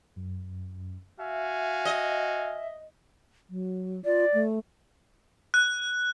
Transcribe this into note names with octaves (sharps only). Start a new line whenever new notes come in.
F#2
F#4 E5 F5 G#5
D#5
F#3
F4 D5
A3
F#6